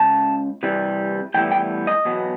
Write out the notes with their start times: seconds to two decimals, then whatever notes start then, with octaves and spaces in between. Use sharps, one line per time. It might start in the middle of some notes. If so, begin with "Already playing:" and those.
Already playing: C#2 C#3 A5
0.63 C3 E3 G3
1.34 A2 E3 G3 B3 E4 G5
1.52 G5
1.87 D#5
2.05 E2 B2 F#3 B3